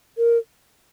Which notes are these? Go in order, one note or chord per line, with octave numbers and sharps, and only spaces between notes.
A#4